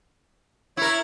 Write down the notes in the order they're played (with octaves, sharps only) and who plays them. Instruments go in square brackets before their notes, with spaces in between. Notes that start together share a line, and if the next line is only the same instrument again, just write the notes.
[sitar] E4 A#4 [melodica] C#5